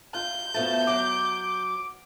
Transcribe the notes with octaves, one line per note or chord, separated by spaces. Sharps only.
F4 G6
B2 F3 A3 A5
F#3 D6